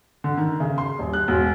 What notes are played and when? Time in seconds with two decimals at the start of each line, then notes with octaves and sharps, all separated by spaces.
0.24 D3
0.37 D#3
0.60 C#3
0.78 C6
0.99 D#1
1.14 F#6
1.28 E1